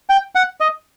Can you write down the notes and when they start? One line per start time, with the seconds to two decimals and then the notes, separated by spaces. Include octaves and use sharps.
0.10 G5
0.35 F#5
0.60 D#5